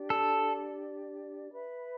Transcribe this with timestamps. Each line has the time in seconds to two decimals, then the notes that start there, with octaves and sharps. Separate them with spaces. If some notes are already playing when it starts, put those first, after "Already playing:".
Already playing: D4 G4 D5
0.10 A4
1.52 B4 E5 B5